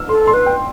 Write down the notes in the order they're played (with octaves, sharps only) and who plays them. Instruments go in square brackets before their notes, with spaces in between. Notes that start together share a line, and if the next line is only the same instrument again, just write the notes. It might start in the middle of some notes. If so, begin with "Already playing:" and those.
Already playing: [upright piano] E6 F6
[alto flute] A4 [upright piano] C6
[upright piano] C6
[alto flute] B4
[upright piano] G5